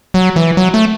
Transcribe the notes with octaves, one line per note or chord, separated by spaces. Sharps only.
F#3
E3
F#3
A3